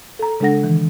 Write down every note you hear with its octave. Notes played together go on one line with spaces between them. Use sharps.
A4 A#5
C#3 G#3 D4 A4 F#5 A#6
D#3 E3